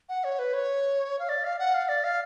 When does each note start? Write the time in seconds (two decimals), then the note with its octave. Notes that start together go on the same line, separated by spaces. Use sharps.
0.09 F#5
0.24 C#5
0.39 B4
0.54 C#5
1.19 F5
1.29 D5
1.44 F5
1.59 F#5
1.74 F5
1.89 D5
2.04 F5